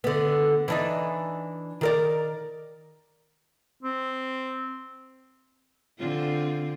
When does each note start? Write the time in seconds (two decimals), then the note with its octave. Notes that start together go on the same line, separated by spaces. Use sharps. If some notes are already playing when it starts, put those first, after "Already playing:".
0.04 D3 B3
0.68 E3 D4 D#4
1.81 D#3 A#4 D5
3.83 C4
5.99 D3 C4 F4